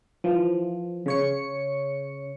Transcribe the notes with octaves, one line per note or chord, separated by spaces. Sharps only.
E3 F3
C#3 C#5 C#7